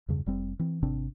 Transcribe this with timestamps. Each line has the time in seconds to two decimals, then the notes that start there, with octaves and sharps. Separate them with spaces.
0.08 E2 G2 C#3
0.26 F1 G3 C4
0.59 E3 C4
0.82 G#1 C3 C4 D4